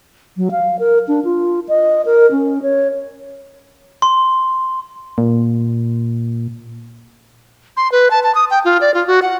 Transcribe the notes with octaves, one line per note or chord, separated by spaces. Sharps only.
F#3
F5
A#4
D4
F4
D#5
A#4
C#4
C#5
C6
A#2
C6
B4
A5
A5
D#6
G5
F4
D5
F4
F#4
F#5